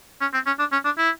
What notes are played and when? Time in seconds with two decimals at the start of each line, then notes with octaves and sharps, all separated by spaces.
0.21 C#4
0.34 C4
0.47 C#4
0.59 D4
0.72 C#4
0.85 D4
0.98 E4